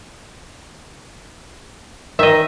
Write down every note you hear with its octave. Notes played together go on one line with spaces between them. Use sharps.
D#3 D#5 E5